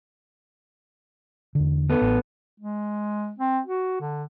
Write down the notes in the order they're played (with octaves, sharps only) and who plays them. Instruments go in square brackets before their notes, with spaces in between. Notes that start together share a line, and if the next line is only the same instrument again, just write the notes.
[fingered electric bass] E2 D3
[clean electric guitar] B3 A4
[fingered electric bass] A1
[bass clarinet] G#3
C4
F#4
D3